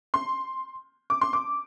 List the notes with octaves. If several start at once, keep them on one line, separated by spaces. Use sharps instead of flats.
C6
D6
C6
D6